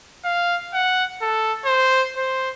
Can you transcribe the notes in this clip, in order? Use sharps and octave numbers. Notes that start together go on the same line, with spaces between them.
F5
F#5
A4
C5
C5